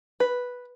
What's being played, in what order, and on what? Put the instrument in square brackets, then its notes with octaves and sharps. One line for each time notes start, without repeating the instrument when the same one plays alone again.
[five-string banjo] B4